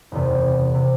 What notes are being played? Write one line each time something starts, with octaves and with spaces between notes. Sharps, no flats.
F#1 E2 C3
C3